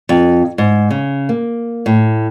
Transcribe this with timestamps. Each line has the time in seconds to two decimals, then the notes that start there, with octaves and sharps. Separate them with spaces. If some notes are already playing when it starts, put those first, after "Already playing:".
0.09 F2
0.58 G#2
0.91 C#3
1.29 A#3
1.86 A2